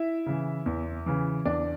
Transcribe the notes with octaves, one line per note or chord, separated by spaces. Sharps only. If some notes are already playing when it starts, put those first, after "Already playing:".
Already playing: E4 E5
C#3 E3
E2
C#3 E3
E2 D4 D5